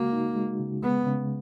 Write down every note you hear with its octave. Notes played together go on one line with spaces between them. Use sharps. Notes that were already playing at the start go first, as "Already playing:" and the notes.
Already playing: C#3 G#3 A#3 F#4
D#4
G#3
C#3
G#3 B3
C#3